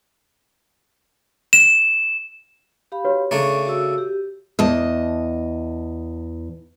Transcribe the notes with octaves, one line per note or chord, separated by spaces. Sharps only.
E7
G4 F5 B5
F#4 B4 C#5
C#3 A3 D4 A#5 C#6
F#4 E6
G4
E2 D#5 A5